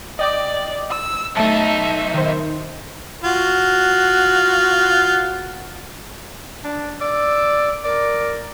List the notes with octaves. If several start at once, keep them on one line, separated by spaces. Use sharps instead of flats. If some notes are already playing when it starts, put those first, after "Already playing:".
D5 D#5 G5 D6
E6
B1 A3 D#4 E5 A5
D#3 C5
F4 F#4
D4
D5 E6
A#4 D5